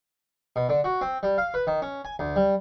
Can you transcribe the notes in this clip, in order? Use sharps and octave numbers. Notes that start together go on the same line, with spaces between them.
B2
D3
F#4
C4
G3
F5
B4
D#3
C#4
G#5
D2
G3